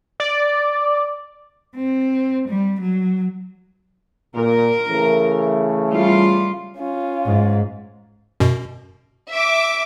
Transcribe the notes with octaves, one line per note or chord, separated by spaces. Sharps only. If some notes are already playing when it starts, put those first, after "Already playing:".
D5
C4
G3
F#3
A#2 A#4
C#3 E3 A3
G3 F4
C#4 F4
G#2
F#2 B2
E5 D6